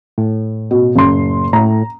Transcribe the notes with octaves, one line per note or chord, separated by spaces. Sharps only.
A2
B2
F#1 C6
A2 A#5